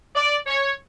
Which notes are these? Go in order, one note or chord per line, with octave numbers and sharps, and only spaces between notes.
D5
C#5